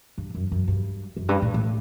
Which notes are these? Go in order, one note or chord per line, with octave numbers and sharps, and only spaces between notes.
G2
F#2
F#2
G2
F#2
G2
A2
A2